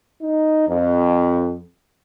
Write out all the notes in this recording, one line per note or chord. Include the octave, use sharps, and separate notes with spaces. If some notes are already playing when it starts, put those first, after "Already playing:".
D#4
F2